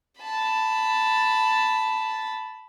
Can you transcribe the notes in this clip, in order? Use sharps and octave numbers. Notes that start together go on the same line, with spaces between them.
A5 B5